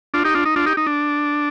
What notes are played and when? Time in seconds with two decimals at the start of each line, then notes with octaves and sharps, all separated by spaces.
0.14 D4 F4
0.24 D#4 G4
0.35 D4 F4
0.45 D#4
0.56 D4 F4
0.66 D#4 G4
0.77 D#4
0.87 D4